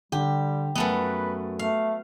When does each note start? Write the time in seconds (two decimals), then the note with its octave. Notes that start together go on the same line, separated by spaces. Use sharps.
0.12 D3 G3 G4
0.75 F#2 A3 B3 B4 F#5
1.59 A3 F5